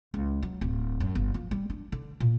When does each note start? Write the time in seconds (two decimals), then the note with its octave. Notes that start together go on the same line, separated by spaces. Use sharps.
0.14 C#2
0.42 F#3
0.61 D1
1.00 F#2
1.15 G1
1.34 F3
1.51 G3
1.70 D4
1.92 D3
2.20 A#2